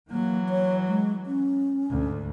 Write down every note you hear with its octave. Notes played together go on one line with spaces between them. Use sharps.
E3 F#3 A#3
C#5
G#3
C#4
D2 G#2